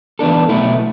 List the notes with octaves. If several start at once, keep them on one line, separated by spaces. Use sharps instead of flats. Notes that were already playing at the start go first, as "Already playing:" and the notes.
E3 B3 D4 A4
B1 B2 A3 E4